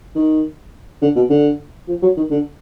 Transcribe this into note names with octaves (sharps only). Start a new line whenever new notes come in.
D#3
D3
B2
D3
F3
F#3
D#3
D3